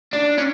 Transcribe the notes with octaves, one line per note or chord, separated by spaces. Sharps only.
D4
C#4